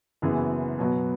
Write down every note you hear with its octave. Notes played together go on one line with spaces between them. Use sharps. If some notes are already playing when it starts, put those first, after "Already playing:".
F#1 F#2 E3 B3 G#4
B2 F#3 B3